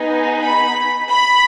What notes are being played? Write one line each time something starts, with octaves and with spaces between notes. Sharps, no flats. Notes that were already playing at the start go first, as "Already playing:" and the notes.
Already playing: B3 D#4 G#4
B5
B5